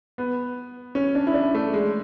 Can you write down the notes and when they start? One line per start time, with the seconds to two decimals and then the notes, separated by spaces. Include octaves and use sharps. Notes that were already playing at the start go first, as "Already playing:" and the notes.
0.18 B3
0.95 C#4
1.15 D4
1.27 E4
1.34 D4
1.55 A3
1.73 G#3